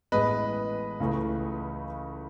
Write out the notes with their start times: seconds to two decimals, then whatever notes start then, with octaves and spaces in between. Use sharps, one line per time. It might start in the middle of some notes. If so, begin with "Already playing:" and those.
0.12 A1 A2 G#3 B3 B4 D#5
1.00 C#2 C#3 E3 A3 C#4